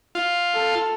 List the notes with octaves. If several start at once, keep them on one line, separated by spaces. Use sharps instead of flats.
F4
A4